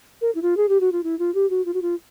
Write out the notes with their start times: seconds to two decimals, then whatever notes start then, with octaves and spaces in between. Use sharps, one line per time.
0.21 A#4
0.35 E4
0.42 F4
0.57 G#4
0.69 G4
0.80 F#4
0.92 F4
1.04 E4
1.19 F4
1.35 G4
1.50 F#4
1.66 F4
1.74 F#4
1.82 F4